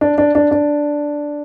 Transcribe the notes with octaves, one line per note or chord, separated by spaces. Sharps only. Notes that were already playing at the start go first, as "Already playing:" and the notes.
D4
D4
D4
D4